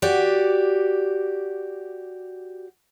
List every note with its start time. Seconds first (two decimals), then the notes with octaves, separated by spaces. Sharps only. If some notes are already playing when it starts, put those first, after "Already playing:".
0.02 F#4 G4 D5